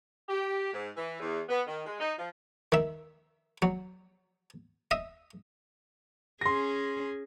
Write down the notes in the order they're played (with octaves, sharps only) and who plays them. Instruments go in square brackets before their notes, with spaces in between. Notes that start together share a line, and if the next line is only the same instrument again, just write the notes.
[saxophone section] G4
G#2
E3
E2
B3
D#3
G#3
D#4
F3
[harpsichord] D#3 E5
F#3
D#5 E5
[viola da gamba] C#4 G#4 [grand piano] C6 A#6